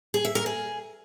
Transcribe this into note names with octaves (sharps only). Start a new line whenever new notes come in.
G#4
E5
A#4
G#4